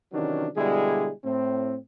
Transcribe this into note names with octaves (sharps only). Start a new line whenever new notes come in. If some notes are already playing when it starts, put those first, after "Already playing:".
C3 D#3 E3 F#3 C#4 D4
B2 D3 G3 G#3 E4 G#4
A2 C4